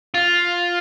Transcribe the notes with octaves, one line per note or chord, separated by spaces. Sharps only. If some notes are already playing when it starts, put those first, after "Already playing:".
F4